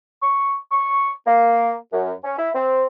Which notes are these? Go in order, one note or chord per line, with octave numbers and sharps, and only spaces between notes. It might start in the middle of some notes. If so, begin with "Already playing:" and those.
C#6
C#6
A#3
F#2
C#4
E4
C4